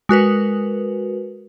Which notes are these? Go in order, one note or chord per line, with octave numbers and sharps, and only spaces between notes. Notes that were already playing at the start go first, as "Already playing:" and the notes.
G#3 F#4 A#4 B4